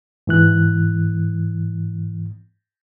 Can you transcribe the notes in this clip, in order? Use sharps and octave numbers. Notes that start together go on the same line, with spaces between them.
G#2 E3 F#6